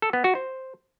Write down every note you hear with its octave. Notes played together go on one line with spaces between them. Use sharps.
A4
B3
F#4
C5